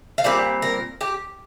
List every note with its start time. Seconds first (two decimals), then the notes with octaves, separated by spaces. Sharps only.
0.18 F5
0.24 A#2 G3 C4 D5
0.62 A#4
1.01 G4